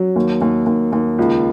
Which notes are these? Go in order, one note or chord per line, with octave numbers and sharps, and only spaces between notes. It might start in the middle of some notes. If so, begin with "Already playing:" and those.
Already playing: F#3
D#2
D#2
D#2
D#2
C#2